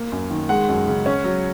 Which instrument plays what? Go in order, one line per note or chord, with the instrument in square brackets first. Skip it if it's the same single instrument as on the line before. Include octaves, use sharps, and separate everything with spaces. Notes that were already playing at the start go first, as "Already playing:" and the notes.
Already playing: [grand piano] A#3
F#2
D#3
G#3 F#5
F#2
C#3
C#4
F#3